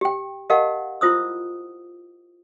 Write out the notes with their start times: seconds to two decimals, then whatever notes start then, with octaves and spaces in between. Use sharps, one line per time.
0.01 G4 G5
0.50 G4 A#4 D#5 F5 F#5 A5
1.01 E4 F4 C5 D#6 E6